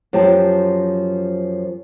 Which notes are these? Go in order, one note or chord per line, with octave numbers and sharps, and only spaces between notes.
F#2 F3 G4 C5 A5